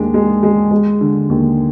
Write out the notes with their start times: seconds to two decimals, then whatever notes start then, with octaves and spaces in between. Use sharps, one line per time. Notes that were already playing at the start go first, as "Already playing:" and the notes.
Already playing: D#2 G#3 D4
0.14 G#3
0.43 G#3
0.71 G#3
1.01 D3
1.29 D#2